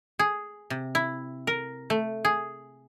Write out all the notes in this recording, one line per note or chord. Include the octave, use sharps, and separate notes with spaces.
G#4
C3
E4
A#4
A3
G#4